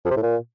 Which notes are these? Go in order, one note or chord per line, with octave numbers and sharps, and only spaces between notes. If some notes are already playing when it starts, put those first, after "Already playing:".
F2
C3
A2
A#2